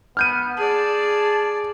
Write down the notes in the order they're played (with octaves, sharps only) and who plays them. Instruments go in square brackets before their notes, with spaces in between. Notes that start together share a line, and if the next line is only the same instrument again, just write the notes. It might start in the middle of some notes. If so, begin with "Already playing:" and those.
[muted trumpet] B3 [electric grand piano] F6 G6 D#7
[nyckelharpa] G#4 D5 [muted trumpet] A5